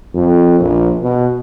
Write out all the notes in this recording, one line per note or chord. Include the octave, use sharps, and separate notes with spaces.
F2
A#1
B2